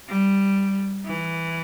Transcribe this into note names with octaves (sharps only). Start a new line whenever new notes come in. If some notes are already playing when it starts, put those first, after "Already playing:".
G3
E3